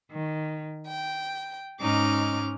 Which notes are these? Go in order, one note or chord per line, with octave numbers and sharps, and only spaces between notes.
D#3
G5
G#2 C#4 D#4 D6 F6